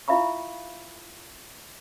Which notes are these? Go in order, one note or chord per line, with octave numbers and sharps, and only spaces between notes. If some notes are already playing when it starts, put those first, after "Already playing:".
E4 F4 E5 F5 B5 C#6